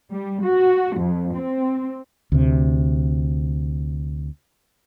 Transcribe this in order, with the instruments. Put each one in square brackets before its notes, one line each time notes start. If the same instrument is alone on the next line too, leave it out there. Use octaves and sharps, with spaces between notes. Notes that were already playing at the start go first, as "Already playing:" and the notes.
[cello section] G3
F#4
F2
C4
[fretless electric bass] D2 C3